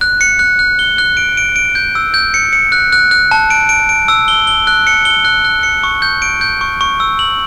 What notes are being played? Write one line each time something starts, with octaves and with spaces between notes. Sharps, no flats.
F#6
C#7
F#6
F#6
G7
F#6
D7
D7
D7
G6
E6
G6
C#7
C#7
F#6
F#6
F#6
A5
D7
D7
D7
E6
G7
G7
F#6
C#7
G7
F#6
F#6
C#7
C#6
G6
D7
G6
C#6
C#6
E6
F#7